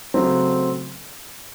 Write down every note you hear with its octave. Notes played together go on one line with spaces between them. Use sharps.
C#3 F#3 A3 C4